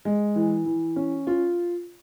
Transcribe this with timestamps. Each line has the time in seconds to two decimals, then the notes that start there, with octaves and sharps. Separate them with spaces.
0.05 G#3
0.36 E3
0.66 E3
0.96 C#4
1.27 F4